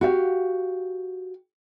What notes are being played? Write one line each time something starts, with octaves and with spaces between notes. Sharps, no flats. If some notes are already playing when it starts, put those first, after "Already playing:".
F#4 G4 F5